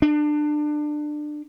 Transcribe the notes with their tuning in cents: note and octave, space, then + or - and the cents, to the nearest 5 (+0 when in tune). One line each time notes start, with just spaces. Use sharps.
D4 +25